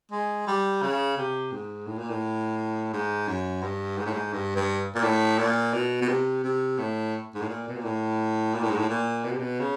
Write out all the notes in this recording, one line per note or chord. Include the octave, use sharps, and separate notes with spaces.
G#3
G3
C#3
C3
G#2
A2
A#2
A2
G#2
F#2
G2
G#2
A2
G#2
G2
G2
A#2
A2
A#2
B2
B2
C3
C3
A2
G#2
A2
A#2
B2
A#2
A2
A#2
A2
G#2
A2
A#2
B2
C3
B2
C#3